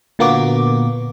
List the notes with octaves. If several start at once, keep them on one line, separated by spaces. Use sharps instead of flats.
A#2 D3 A#3 B3 F#4 D6